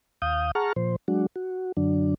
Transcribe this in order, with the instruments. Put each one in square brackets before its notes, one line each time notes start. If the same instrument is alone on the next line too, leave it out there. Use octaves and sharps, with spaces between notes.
[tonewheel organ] D#2 F5 D#6 G6
G#4 F#5 A5 A#5 C#6 F6
A#2 F3 C5
F#3 G#3 D4 F#4
F#4
F#2 D3 F#3 D4